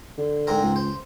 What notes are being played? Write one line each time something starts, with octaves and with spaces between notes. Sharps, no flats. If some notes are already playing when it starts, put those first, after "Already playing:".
D3
G#2 C4 A#4
C#2
C5